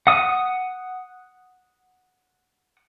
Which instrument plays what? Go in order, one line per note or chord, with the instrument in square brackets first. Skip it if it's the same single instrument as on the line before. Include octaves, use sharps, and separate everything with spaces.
[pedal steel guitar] F#5 D#6